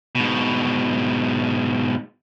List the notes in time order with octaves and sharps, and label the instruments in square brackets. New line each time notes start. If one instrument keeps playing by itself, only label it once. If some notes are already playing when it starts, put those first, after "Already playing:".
[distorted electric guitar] G#2 B2